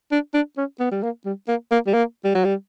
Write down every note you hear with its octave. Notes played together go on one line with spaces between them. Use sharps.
D4
D4
C#4
B3
G3
A#3
G3
A#3
A#3
G3
A#3
G3
F#3
G3